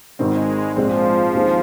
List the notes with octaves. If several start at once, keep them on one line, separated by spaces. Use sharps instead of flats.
G#1 G#2 D#3 G#3 C4
A#1 G#2 F3 G#3 C4
D#2 D#3 G#3 C4